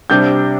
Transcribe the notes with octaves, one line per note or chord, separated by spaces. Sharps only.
C3 G3 D4 G6